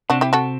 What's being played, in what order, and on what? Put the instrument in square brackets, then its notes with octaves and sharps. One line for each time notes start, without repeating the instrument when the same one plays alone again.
[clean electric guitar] C3 C4 [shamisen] D4 F#4
[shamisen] E4 G4
F#4 A4